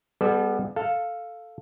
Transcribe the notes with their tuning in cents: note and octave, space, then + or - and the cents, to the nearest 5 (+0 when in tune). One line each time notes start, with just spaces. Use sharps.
G3 +25 B3 +0 A4 -35
A4 +0 F5 +0